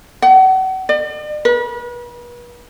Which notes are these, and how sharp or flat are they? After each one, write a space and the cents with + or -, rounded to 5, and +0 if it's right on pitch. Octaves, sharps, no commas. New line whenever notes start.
F#5 +35
D5 +45
B4 -40